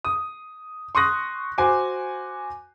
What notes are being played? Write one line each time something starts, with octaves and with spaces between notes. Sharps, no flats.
D#6
C6 C#6 D#6 F#6 A#6
F#4 C5 G#5 D6